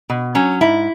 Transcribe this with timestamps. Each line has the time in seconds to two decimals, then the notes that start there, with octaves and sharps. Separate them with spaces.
0.10 B2
0.35 F#3 C#4
0.61 G#2 E4